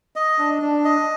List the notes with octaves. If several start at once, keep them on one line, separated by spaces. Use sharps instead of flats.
D#5
D4
D4
D#5